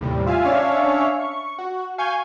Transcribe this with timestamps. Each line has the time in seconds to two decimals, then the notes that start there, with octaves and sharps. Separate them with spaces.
0.01 D#2 A2 C3 G3
0.26 F4 E5 F5 G#5
0.45 C#4 D4 C#5 E5 F5
1.20 C#6
1.58 F#4
1.98 F5 G#5 C#6 G6 G#6